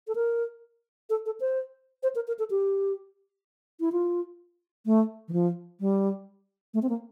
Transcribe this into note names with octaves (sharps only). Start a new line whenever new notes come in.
A4
A#4
A4
A4
C5
C5
A#4
A#4
A4
G4
E4
F4
A3
E3
F3
G3
A3
C4
A#3